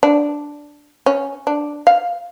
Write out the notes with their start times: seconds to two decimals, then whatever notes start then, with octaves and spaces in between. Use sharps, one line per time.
0.03 D4
1.06 C#4
1.47 D4
1.87 F5